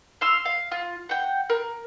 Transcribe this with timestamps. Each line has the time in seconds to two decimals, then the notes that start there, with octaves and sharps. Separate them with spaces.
0.21 F5 C6 E6 F6
0.45 F5
0.71 F4
1.09 F#5 G5
1.50 A#4